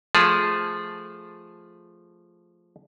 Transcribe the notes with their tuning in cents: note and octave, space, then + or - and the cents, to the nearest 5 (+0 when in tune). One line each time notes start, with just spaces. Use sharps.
F3 +0 A3 -10 G#4 +0